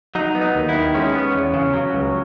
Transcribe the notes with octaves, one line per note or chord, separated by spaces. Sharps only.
F#3 D#4
B3
D#4
D#2
E4
D#3
G#3 C#4
B3
E2
C#3
F#3
C#2